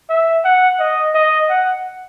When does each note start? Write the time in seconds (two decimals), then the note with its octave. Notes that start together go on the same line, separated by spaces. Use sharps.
0.09 E5
0.44 F#5
0.79 D#5
1.14 D#5
1.49 F#5